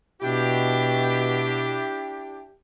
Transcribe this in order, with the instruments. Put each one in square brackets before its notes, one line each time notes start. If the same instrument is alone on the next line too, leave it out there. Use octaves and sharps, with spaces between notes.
[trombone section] B2 F#4 [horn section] D4 E4 G4